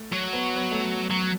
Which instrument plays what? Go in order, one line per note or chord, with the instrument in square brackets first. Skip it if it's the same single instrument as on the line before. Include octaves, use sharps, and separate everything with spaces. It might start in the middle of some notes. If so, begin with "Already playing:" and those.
Already playing: [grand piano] A3
[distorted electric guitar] F#3
[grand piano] B3
B3
A3
[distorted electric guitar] F#3